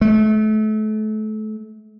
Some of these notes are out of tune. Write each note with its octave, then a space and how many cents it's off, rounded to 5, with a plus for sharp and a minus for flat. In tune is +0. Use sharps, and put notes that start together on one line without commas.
A3 -30